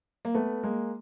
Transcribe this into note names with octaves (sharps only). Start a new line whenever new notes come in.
A#3
A3 B3
G#3 A#3